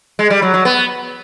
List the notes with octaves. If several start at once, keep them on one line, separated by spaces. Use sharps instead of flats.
G#3
G3
F#3
F#3
B3